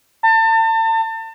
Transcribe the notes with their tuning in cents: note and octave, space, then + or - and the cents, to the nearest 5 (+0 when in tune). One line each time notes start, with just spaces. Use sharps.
A5 +35